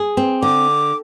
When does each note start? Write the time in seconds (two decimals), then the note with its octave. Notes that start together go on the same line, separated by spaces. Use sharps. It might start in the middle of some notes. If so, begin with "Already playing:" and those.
Already playing: G#4
0.17 C4
0.42 D3 D6